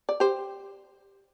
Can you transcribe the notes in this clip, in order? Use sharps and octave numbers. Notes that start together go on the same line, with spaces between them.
D5
G4 C5